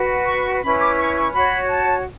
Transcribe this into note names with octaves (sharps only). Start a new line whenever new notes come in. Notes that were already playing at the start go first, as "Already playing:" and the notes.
Already playing: F#4 B4
C#6
C#4 E4 B4 B5
D6
C#6
C#6
F#4 C#5 B5
A5